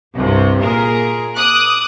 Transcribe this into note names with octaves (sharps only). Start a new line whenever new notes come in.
C2 G2 C3
A#2 G#4 A#4
D6 D#6 F#6